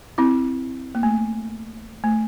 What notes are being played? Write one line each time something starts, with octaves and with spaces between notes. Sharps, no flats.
C4 E4
A#3
A3
A3